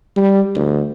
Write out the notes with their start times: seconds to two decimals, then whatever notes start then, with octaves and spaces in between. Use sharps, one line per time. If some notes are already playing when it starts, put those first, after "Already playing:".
0.17 G3
0.56 D2